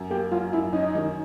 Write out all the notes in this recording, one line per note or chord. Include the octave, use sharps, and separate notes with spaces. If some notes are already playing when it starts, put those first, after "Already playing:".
Already playing: F#2
A#3 G4
F#3 F4
F#2 E4
C#4 D#4
D#3